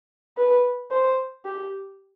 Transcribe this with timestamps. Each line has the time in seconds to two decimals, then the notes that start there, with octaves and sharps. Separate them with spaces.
0.37 B4
0.91 C5
1.45 G4